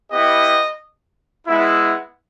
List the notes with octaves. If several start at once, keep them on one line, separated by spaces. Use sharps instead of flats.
B3 E4 G4 D#5
G#3 B3 E4